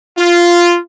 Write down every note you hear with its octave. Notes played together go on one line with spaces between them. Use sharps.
F4